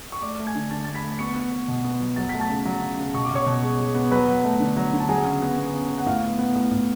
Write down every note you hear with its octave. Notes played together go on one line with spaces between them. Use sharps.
C#6
A3 D5 D6
A3
G#5 G#6
D3
D3 A5 A6
A3 A6
B5 B6
A3
B3 C#6 C#7
B3
B3
B2
B3
F#3
F#3 A6
A3 B6
A5 A6
C#3
F#3
C#3
C#3
B2 C#6
D6
B2 C#5 C#6
B2
G#3
G#3
B3
F#3 B4 B5
F#3
A3
D3
F#3
D3
A5
F#3 G#4 G#5
C#3
B3
B3
C#3
B3
F#5
A2 F5
B3
B3
A2
A2